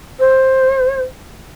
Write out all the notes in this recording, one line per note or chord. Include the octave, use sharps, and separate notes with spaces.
C5